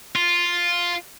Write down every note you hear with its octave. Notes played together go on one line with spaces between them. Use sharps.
F4